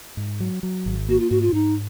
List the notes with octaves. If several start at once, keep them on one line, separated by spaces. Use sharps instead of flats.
G#2
F#3
F#3
G#1
A#3 F#4
F4
G#2 F#4
F4
G#2 D#4